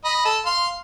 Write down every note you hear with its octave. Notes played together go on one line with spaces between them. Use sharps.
D#5 B5
A4
F5 C6